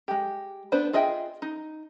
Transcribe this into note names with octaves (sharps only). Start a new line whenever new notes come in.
G#3 G4
B3 D4 B4 C5 A5
F4 G#4 D#5 E5 G5
D#4